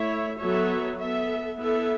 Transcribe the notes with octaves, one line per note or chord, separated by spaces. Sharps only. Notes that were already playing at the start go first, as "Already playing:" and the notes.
Already playing: A3 E4 C#5 E5
F#3 B3 A4 C#5 E5
B3 A4 E5
B3 E4 A4 E5